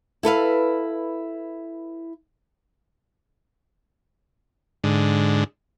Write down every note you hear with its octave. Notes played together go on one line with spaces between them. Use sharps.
E4 A4 B4 F5
G#2 D3